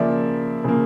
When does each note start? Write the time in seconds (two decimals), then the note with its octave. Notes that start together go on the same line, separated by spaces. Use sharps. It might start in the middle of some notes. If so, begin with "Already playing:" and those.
Already playing: C#3 F3 A#3 D5 E5
0.64 C#3 F3 A#3